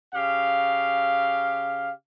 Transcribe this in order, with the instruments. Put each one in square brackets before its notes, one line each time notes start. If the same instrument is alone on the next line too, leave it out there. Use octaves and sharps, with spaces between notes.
[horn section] C#3 G4 F5